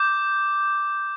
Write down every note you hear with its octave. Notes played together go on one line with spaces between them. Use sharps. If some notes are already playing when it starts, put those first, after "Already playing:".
Already playing: D6 G6